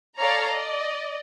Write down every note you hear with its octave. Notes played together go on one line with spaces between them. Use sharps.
A4 C#5 D5 F5 A5 A#5
D5 D#5